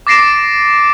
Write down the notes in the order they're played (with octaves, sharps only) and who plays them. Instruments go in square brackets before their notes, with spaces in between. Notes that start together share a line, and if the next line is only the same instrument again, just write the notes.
[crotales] D6 A6 A#6 C7 D7 E7